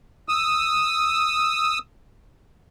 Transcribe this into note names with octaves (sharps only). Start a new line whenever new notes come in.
D#6 E6